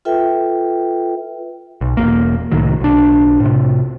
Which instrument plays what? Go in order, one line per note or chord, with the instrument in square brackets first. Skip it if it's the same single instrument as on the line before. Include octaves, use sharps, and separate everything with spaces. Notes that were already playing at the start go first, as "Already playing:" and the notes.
[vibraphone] F4 A4 B4 E5 G5
[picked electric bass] B1
E1 F2 A#3
C2 A2 D#3 F#3
B1 D4
A2 C3